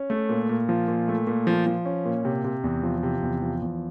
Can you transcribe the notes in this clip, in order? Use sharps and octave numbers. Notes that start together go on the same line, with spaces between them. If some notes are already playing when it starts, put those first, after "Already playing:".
Already playing: C#4
A3
A#2
A#2
F3
A#2
A3
A#2
F3
F3
C#4
A#2
C3
C3
E2
F3
C3
E2
F3
E2